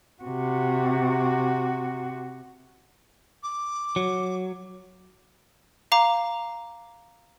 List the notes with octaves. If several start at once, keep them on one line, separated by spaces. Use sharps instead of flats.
C3 F#4
D6
F#3
F5 A#5 D6